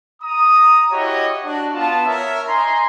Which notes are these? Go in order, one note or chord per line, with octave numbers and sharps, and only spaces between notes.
A#5 D#6
E4 F#4 G4 C#5 D#5
D4 F#4
B3 F4 A5
A#4 C#5 E5
D#4 G#5 A#5 C6